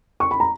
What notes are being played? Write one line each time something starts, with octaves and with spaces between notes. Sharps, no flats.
C#6
B5
A#5